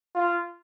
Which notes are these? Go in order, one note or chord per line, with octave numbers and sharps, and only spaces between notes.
F4